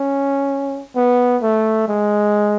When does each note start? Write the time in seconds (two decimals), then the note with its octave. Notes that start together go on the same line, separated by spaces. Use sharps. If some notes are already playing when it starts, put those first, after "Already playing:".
Already playing: C#4
0.96 B3
1.42 A3
1.88 G#3